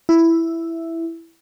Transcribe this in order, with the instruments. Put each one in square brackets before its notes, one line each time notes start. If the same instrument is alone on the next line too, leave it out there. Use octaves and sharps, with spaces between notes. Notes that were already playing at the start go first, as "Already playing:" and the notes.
[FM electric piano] E4